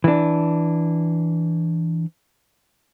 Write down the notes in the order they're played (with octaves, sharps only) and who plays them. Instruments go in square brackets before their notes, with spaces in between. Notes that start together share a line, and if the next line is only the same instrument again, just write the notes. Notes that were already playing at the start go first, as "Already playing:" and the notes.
[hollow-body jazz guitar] E3 D4